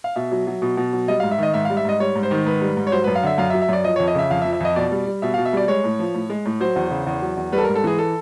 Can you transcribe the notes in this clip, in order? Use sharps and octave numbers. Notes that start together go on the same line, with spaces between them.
F5
B2 E5
F#3
F#3
B2
B2
F#3
G3 D#5
F5
G#2
E5
D#3 D#5
G#2 E5
F5
G3
E5
G#2 D#5
G3 C#5
G#2
C5
D#3
G#2 B4
G3
G#2
C#5
F#3 C5
B4
F#2
F5
D3 E5
F#2 F5
E5
F#3
E5
F#2 D5
F3 D#5
C#5
F2
D#5
C#3 E5
F2 F5
E5
F3
E5
F2 D#5
B2 D5
G3
G3
B2 E5
F5
B2
E5
G3 D5
G#3 C#5
A2
F3
A2
G#3
A2
F#3 C5
E2
C#3
E2
F#3
E2
G3 B4
A4
A#4
G#2
A4
E3 G#4
A4